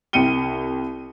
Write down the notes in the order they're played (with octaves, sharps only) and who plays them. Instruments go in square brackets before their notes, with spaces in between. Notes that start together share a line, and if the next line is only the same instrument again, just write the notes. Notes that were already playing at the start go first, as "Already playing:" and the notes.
[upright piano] C2 G5 C#7 D#7 G7